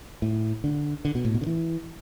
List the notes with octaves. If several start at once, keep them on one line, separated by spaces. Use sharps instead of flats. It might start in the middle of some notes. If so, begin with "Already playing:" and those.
A2
D3
D3
B2
A2
B2
D3
E3